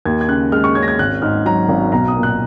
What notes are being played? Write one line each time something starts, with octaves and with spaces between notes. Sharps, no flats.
D#2 G#6
G#6
C#3 F#6
G#3 F6
C#6
C#4 G#6
A#6
G#6
G#1 F#6
G#2 F6
F#3 A#5
G#1
B1 A#5
D#6
A#2
F#6